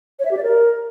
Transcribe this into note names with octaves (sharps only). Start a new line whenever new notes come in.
C#5
E5
G4
D5
A#4